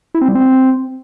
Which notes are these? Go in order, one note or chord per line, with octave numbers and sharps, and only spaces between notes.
E4
C4
G3
C4